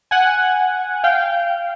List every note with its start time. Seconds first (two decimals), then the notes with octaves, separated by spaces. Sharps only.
0.11 F#5 G#5
1.04 F5 G5